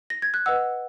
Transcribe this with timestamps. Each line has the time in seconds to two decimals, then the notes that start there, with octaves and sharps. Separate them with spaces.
0.10 A#6
0.22 G#6
0.34 F#6
0.46 B4 D#5 F#5 E6